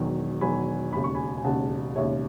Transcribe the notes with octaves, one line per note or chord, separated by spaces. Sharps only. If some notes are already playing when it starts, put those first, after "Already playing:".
Already playing: E1 E2 D#3 F#3
E1 E2 D#3 F#3 G#5 B5
E1 D#2 C#3 B5
C#6
G#5 B5
G#5
E1 D#2 C#3 F#5 A5
E1 D#2 C#3 C#5 E5